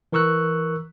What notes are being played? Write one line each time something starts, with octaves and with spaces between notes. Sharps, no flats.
E3 A#4 C#6 E6 F#6